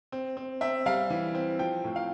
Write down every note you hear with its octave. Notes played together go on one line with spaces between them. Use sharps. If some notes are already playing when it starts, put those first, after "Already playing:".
C4
C4
C4 E5
G3 F5
E3
C4
F3 G5
A2
F5